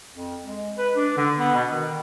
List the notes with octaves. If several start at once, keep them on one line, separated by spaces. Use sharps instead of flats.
F2
G#3
B4
D4
D3
B3
B2
D#3